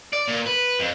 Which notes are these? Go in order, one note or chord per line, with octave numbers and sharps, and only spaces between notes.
D5
A#2
B4
F2